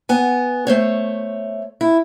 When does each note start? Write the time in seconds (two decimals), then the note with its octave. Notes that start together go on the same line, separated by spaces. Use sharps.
0.09 B3 G#5
0.67 A3 C5 C#5
1.81 E4